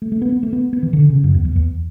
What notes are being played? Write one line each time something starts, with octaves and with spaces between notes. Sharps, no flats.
A3
A3
B3
B3
A3
B3
B3
E3
D3
C#3
F#2
E2
E2
E2